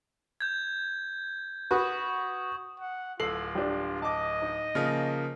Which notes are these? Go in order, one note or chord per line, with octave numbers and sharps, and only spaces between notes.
G6 G#6
F#4 B4 C#6 D#6
F#5
D1 F4 A4 C7 F#7
G3 D4
D#5 A5 D6
D#4
C#3 F3 A#3